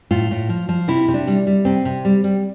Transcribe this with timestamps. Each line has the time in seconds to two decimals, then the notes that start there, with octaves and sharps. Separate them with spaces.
0.11 A2 F4
0.31 A2
0.49 F3
0.69 F3
0.88 C3 E4
1.08 C3
1.14 D4
1.27 G3
1.47 G3
1.65 C3 C4
1.85 C3
2.05 G3
2.24 G3